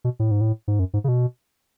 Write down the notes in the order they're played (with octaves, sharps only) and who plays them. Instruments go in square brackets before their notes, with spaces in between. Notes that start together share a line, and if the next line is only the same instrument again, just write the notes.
[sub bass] B2
A2
G#2
A2
G#2
F#2
G#2
C#3
B2